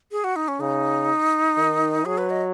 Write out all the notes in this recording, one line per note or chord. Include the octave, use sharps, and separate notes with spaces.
G#4
F#4
D#4
C#4
C#3 D#4
D#3
F#3 G#4
B4
D#5